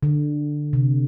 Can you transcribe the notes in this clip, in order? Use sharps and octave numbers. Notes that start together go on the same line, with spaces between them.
D3
C3